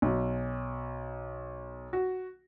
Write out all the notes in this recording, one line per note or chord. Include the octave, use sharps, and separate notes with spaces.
B1
F#4